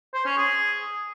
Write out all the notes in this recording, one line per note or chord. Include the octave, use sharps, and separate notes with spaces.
C5
C#4
G#4